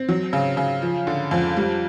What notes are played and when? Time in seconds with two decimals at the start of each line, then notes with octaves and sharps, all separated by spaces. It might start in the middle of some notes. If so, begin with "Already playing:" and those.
Already playing: C4
0.09 F#3
0.33 C#3
0.57 C#3
0.82 F3
1.07 D3
1.31 F2
1.57 G3